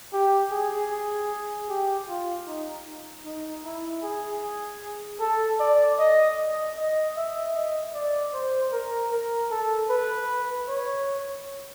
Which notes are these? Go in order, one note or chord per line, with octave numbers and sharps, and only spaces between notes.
G4
G#4
G4
F4
D#4
D#4
E4
G#4
A4
D5
D#5
D#5
D#5
E5
D#5
D5
C5
A#4
A#4
A4
B4
C#5